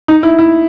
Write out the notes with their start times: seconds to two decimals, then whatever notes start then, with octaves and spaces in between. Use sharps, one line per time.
0.08 D#4
0.23 E4
0.39 E4